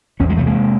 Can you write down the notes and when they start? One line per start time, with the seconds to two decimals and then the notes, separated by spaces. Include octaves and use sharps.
0.20 E2 B3 C#4
0.29 F#3 G#3
0.37 C3 G3 A3
0.46 G#3 A#3